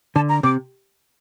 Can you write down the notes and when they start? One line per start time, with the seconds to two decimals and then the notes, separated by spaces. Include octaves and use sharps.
0.16 D3 A5
0.29 A#5
0.43 C3 D6